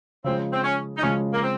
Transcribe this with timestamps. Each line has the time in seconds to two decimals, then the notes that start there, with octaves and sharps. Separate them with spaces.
0.24 C#3 F3 G#3 C4
0.53 C4
0.64 C#4
0.98 D#4
1.03 C#3 F3 G#3 C#4
1.33 A#3
1.43 C4